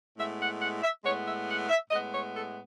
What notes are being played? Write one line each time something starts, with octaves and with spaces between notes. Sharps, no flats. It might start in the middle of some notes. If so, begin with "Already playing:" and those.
A2 G#3 B3 E5
F#5
F#5
E5
A2 G#3 B3 C#5
E5
F#5
E5
A2 G#3 B3 D#5
C#5
A4